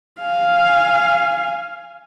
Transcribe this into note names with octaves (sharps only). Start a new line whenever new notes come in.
F5 G#5